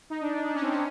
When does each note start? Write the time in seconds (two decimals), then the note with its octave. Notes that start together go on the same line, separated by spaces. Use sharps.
0.10 D#4
0.21 D4
0.35 D4
0.46 D4
0.55 C#4
0.62 C4
0.71 C#4